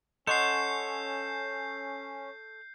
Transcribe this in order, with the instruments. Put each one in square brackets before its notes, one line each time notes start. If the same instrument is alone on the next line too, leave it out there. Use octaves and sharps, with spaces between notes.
[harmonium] C#4 [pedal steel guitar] A4 C#5 [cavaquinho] D#5 F#5 C6 [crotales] G6 C7